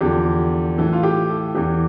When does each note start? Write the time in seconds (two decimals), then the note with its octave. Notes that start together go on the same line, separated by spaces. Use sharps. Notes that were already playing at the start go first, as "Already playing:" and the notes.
0.01 E2 D3 F3 G4
0.78 A2 E3 A4
0.93 F4
1.03 G4
1.29 A4
1.55 E2 E3 G4